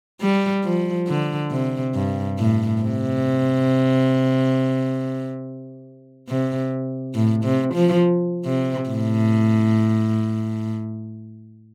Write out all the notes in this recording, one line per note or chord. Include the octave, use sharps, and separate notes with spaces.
G3
F3
D3
C3
G2
A2
C3
C3
A2
C3
F3
C3
A2